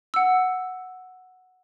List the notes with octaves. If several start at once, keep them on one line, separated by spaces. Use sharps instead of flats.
F#5 E6